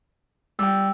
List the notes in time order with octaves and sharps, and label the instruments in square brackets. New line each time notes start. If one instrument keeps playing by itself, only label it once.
[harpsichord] G3 [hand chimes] G5 E6